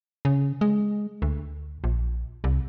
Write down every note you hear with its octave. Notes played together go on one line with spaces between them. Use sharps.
C#3
G#3
D2
A#1
C2